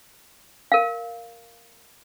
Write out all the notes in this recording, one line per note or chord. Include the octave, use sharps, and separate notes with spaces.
A#4 F5